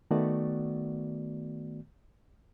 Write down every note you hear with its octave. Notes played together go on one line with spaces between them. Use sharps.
D#3 A3 B3 F#4 D5